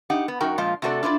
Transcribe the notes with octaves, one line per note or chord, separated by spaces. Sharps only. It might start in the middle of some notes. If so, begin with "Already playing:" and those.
D#4 G4 F#5
B3
F#2 D#4 F#4 A#4 G5
A#2 F3 G#3 F4
C3 A3 F#4 A4 C#5 D5
D4 E4 F4 C5 D5